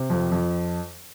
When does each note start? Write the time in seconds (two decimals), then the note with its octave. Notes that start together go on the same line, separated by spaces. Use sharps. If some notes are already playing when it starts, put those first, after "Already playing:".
Already playing: C3
0.10 F2
0.32 F2